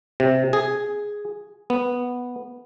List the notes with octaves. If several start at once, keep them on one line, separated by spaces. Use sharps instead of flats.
C3
G#4
B3